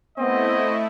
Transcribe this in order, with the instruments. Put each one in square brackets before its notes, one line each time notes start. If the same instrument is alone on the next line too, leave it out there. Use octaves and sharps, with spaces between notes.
[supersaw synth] A3 E4 [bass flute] B3 [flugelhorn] C4 [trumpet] D#5